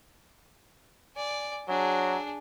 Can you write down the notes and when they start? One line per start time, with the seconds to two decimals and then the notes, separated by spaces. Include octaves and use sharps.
1.15 D5 G#5
1.68 F#3 D4 G#4